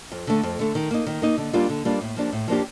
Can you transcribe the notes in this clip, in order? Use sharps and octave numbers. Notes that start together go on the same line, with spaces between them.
F2
D3 A3
F2
D3 A3
D#3
A#3 D#4
D#3
A#3 D#4
D3
G3 A#3 D4 F4
D3
G3 A#3 D4 F4
A2
F3 A#3 D4 G4
A2
F3 A#3 D4 G4